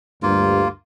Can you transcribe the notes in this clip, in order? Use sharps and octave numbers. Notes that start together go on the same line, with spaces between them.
D2 G2 A#3 F4